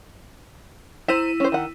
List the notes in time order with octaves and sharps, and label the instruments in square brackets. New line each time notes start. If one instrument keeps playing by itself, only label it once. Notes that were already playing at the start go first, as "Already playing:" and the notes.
[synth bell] E4 E6 D#7 [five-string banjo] C5 A#5
[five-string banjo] C#4 C5
D#3 F#5